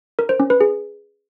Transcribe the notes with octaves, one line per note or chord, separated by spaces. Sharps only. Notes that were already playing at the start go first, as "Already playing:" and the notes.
A#4
C5
C#4
B4
G#4